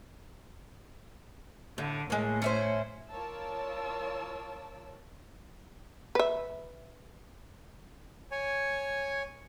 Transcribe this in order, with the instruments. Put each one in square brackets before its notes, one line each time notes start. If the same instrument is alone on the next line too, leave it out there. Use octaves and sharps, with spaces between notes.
[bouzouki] A2 [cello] D3
[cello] A2 [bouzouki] G#3 A#3
[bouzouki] C#4 E4 C5
[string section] F4 A#4 C#5 D5 A5 E6
[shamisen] B4 E5
[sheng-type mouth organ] C#5 G#5